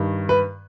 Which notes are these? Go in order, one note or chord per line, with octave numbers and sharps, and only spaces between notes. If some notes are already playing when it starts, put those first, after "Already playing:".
Already playing: G2 D#3
B4